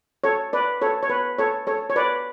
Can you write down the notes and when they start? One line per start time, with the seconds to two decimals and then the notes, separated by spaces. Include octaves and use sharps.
0.24 A4 C#5
0.53 B4 D5
0.82 A4 C#5
1.03 C#5
1.09 B4
1.39 A4 C#5
1.67 A4 C#5
1.90 C#5
1.96 B4 D5